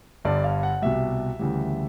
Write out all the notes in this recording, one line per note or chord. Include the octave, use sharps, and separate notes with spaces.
G1 G2 D3 D5
F5
F#5
C2 B2 G3 E5
D2 C#3 E3 G3